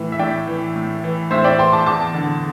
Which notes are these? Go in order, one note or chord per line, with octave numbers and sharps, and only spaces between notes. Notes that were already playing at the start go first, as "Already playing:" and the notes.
Already playing: A2 E3
E5
A2 D5 G5
E3
A2
E3
A2 C5 E5
D5 G5
E3 G5 C6
A5 D6
E2 A5 D6
D3